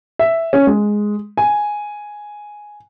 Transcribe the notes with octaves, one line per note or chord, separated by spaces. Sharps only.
E5
C#4
G#3
G#5